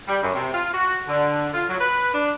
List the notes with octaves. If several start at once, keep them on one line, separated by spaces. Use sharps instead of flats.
G3
F#2
C3
F4
F#4
D3
F4
F#3
B4
D4